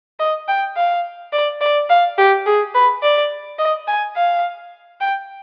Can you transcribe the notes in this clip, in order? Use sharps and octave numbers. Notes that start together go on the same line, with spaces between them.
D#5
G5
F5
D5
D5
F5
G4
G#4
B4
D5
D#5
G#5
F5
G5